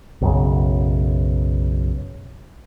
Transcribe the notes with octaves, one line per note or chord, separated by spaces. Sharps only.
B1 F#2 C#3